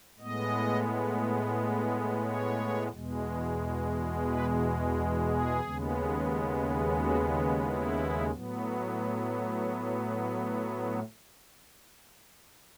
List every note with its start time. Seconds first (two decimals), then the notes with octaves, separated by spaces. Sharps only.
0.19 A2 G#3 B3 D#5
2.22 C#5
2.90 E2 B2 G#3
4.25 B4
5.27 G#4
5.61 D#2 C#3 G#3 B3
6.96 F#4
7.64 E4
8.31 A2 F#3 B3